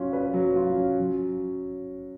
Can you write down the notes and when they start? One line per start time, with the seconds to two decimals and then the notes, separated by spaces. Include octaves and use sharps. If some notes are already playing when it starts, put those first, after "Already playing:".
Already playing: F#3 C#4 F4
0.13 B4
0.34 F#3
0.56 F4
0.77 C#4
0.99 F#3